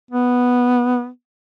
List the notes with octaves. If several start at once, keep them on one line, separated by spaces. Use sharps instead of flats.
B3